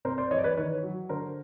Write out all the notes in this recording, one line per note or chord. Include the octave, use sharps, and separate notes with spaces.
C3 A#4 C5
C5 D5
E3 C#5 D#5
D5
B4 C#5
D#3 B4 C#5
F#3
D3 A#4 C5